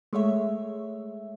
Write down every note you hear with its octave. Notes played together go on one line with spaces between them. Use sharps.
G#3 A3 C#5 E5